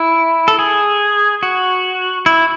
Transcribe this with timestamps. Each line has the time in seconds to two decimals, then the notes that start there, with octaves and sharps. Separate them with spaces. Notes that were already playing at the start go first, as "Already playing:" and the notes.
Already playing: E4
0.48 A4
0.59 G#4
1.43 F#4
2.26 E4